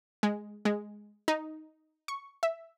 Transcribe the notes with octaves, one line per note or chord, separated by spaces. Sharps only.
G#3
G#3
D#4
C#6
E5